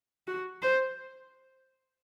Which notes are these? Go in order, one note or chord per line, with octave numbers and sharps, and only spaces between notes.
F#4
C5